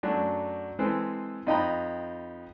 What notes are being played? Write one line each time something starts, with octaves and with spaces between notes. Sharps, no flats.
F#2 F#3 A3 D4
E3 G#3 C4 A4 B4 C5
F2 D#4 D#5 G5 A#5 B5